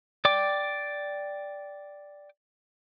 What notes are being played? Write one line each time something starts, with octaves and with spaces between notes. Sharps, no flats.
D5 G5 D6